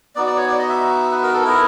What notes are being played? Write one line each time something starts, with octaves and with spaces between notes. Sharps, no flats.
B3 D#4 F#4 D5
D5
C#5
D5
D#5
E5
B4
A#4
A4
B3 E4 A#4